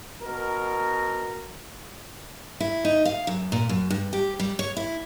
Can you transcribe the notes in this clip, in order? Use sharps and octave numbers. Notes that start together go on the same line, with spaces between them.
B2 A#4
E4
D#4
F5
F#2
A#2
F#2
G2
G4
G3
C#5
E4